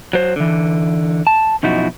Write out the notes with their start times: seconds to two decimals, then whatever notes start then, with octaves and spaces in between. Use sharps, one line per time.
0.13 F#3 C5
0.36 D3 E3
1.27 A5
1.63 F#2 B2 F3 D#4 E4 F#4